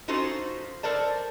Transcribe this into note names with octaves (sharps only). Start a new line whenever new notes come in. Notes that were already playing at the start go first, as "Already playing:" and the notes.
C#4 D#4 F4 F#4 A4 C5
A4 A#4 C5 D5 A5